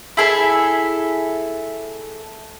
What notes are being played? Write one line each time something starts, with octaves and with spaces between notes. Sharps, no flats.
E4 G#4 A4 E5